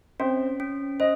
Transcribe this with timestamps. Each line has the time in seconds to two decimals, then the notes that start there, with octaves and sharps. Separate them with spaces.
0.20 C4 C#4 C5
0.60 C#4
1.00 C5 D#5